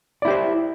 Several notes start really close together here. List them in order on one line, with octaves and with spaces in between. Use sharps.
D5 E4 G4 C5